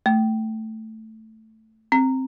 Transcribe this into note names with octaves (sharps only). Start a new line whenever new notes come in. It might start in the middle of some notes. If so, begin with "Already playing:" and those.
A3
C4